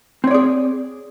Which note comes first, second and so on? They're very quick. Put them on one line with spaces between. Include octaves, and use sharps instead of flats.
C4 C#5 D5 G#4